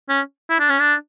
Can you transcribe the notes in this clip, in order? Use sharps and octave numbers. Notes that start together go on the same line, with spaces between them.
C#4
E4
D4
C#4
D4